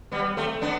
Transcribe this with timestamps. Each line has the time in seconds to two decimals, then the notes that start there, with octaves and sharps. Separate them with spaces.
0.12 G3 B3
0.37 A3 C4
0.61 B3 D4